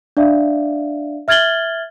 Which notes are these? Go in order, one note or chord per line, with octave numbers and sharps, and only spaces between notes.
D4 D5 E5 F5
E5 F6 G#6 A6 F#7 G7